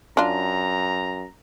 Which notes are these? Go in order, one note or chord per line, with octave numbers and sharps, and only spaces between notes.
F#2 D4 F4 A#5